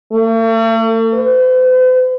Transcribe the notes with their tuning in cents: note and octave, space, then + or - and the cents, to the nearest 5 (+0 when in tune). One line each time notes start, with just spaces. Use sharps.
A3 +45
C5 -45